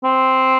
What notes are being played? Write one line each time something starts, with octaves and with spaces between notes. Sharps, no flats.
C4